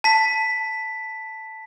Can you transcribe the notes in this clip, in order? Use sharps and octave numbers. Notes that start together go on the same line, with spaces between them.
A5 B6